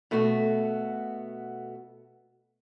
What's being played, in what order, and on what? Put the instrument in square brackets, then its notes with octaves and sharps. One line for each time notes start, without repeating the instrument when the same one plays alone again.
[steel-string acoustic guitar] B2 A3 B3 F#4